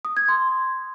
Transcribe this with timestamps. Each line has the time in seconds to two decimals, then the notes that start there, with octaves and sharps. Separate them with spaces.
0.05 D#6
0.17 G#6
0.29 C6